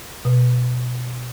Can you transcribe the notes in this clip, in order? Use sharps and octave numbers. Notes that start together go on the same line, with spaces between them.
B2